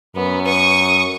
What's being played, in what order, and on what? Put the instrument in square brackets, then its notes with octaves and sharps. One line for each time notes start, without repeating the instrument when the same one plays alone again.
[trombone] F#2 [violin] B3
[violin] C#6 D#6